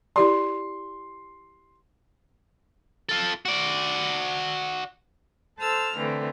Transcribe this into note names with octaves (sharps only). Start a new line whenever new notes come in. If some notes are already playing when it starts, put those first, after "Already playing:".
E4 G4 D5 C6
F4 A4
F#4 D5
A4 C5 A5 E6 F6
D3 E3 A3 C4